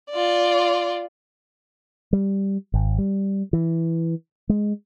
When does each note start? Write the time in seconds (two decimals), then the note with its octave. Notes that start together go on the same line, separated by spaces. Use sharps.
0.10 F4 D5
2.13 G3
2.74 G#1
2.98 G3
3.53 E3
4.49 G#3